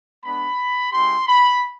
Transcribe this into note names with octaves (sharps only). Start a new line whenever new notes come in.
G#3 B3 D4 B5
G#3 C#4 E4 G4 C6
B5